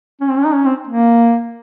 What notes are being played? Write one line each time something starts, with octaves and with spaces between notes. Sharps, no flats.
C#4
C4
C#4
D#4
C#4
C4
A#3